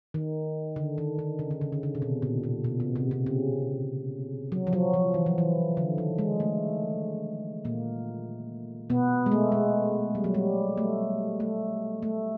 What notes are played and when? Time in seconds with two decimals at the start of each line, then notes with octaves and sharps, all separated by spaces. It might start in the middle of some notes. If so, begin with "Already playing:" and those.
0.14 D#3
0.76 D3
0.98 D#3
1.19 D#3
1.39 C#3
1.51 D3
1.61 C#3
1.72 D3
1.83 C#3
1.95 C3
2.02 B2
2.22 A#2
2.44 A#2
2.64 B2
2.80 C3
2.96 C3
3.11 C3
3.26 C#3
4.52 F#3
4.67 F3
4.73 F#3
4.94 F3
5.14 E3
5.26 F3
5.38 E3
5.77 D3
5.98 D#3
6.18 G#3
6.40 A3
7.65 A#2 A#3
8.90 B2 B3
9.26 G#3
9.32 A3
9.52 G#3
10.15 G3
10.24 F#3
10.34 G3
10.77 A3
11.40 A3
12.03 A3